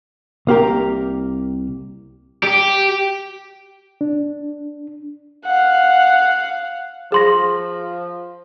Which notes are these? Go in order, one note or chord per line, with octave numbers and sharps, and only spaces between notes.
C2 A#3 G4 A#4
G4
D4
F5 F#5
F3 G#4 C6 A#6